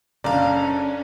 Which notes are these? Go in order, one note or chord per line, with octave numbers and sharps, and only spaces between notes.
F#1 C#4 D4 A4 D5 F5 A#5